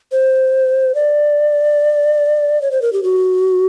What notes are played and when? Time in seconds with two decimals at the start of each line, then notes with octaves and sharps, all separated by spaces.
0.12 C5
0.95 D5
2.62 C#5
2.71 C5
2.82 A#4
2.93 G4
3.03 F#4